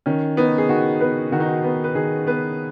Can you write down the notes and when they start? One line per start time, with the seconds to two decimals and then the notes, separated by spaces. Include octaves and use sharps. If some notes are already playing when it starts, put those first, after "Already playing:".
0.06 D#3 C#4
0.37 B3 D#4
0.58 G#4
0.69 D#3 F#4
1.00 B3 B4
1.32 D#3 F#4
1.40 D#4
1.49 F#4
1.64 B3
1.84 B4
1.95 D#3 G#4
2.27 B3 B4